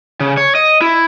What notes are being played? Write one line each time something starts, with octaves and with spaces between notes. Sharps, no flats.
C#3
C#5
D#5
E4